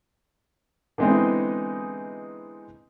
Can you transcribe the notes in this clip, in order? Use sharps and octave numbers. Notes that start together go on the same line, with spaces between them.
D3 E3 G#3 B3 C4 D#4